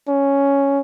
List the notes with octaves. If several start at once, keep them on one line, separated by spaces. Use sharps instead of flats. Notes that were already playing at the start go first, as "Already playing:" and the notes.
C#4